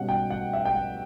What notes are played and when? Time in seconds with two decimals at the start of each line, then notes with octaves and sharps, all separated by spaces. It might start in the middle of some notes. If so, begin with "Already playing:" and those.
Already playing: B2 G3 C#4 F#5
0.09 G5
0.30 F#5
0.53 E5
0.65 G5
0.75 F#5